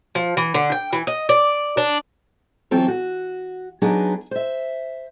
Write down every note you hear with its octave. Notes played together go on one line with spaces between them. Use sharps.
F3
E3
D3
G5
E3
D#5
D5
D4
E3 F#3 C4 F4 A4
F#4
F#3 B3 D4 D#4 G#4
C5 E5